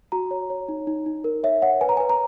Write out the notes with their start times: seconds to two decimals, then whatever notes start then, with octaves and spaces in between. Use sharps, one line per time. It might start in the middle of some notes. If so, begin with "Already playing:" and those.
0.12 F#4 A#5
0.31 C#5
0.50 C#5
0.68 D#4
0.87 D#4
1.06 D#4
1.24 A#4
1.43 C#5 E5
1.62 C#5 F#5
1.81 B4 G#5
1.89 A#5
1.97 B4 G#5
2.09 A#5